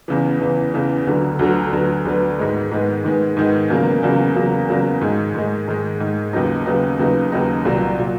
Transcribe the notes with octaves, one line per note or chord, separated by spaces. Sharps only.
E2 C#3 E3
E2 C#3 E3
E2 C#3 E3
D2 D3 F#3 B3
D2 D3 F#3 B3
D2 D3 F#3 B3
D2 D3 F#3 B3
G#2 D#3 G#3 B3
G#2 D#3 G#3 B3
G#2 D#3 G#3 B3
G#2 D#3 G#3 B3
E2 C#3 F#3 A#3
E2 C#3 F#3 A#3
E2 C#3 F#3 A#3
E2 C#3 F#3 A#3
G#2 D#3 G#3
G#2 D#3 G#3
G#2 D#3 G#3
G#2 D#3 G#3
D#2 C#3 F#3 B3 D#4
D#2 C#3 F#3 B3 D#4
D#2 C#3 F#3 B3 D#4
D#2 C#3 F#3 B3 D#4
C2 A#2 F#3
A#2 F#3